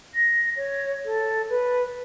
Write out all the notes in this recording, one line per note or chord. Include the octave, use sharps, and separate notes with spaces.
A#6
C#5
A4
B4